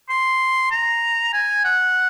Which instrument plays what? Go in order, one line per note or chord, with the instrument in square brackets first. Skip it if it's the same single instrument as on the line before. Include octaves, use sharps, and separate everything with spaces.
[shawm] C6
A#5
G#5
F#5